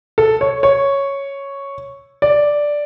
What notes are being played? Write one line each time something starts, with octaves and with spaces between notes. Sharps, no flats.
A4
C#5
C#5
D5